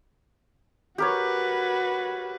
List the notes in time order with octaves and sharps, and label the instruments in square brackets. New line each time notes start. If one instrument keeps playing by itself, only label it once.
[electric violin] F#4 B4 [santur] G4 A#4 C#5